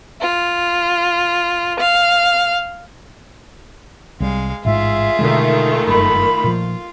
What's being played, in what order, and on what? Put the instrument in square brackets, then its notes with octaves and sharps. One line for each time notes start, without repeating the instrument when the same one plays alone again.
[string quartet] F4
F5
[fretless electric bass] C2 G3 [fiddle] G#3 F5
[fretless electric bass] A1 G#2 G#3 [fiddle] F4 G#4 [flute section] E5
[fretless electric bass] B2 D3 G#3 [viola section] D#3 A3
[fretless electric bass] F#1 G2 [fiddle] F4 [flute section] B5
[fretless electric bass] A#2 F3